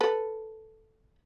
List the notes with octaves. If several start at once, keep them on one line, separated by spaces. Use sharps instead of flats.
A4 B4